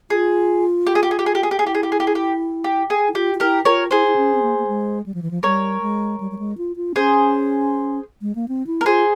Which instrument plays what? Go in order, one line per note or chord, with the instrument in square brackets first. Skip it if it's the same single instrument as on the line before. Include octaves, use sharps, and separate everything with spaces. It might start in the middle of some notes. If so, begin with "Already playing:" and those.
[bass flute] F4 [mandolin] G#4
[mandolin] G4
G#4
G4
G#4
G4
G#4
G4
G#4
G4
G#4
[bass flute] E4 [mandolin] G4
[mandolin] G#4
G4
G#4
G4
G#4
G4
G4
G#4
[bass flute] E4
[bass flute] F4 [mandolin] G4
[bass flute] F4
[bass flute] E4 [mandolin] G4 A#4
[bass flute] F4 [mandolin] A#4 C#5
[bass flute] E4 [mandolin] G#4 C5
[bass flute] E4
C#4
C4
A#3
A#3
G#3
G3
F3
E3
F3
[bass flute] G3 [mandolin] A#4 C#5
[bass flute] G#3
G3
G3
G#3
F4
F4
[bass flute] C#4 [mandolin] G#4 C5
[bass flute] G#3
A#3
C4
E4
[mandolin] A#4
[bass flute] F4 [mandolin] G#4 C5